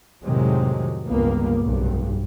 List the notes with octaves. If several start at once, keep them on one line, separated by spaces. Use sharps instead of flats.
F2 A2 C3 D#3 F#3 G#3
G1 C#2 G2 A#3 B3
F1 B1 G2